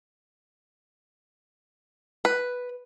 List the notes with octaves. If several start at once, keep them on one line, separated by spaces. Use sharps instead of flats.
B4